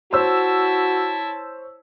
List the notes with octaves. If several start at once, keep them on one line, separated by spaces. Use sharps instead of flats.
E4 F#4 C5 C#5 A5 E6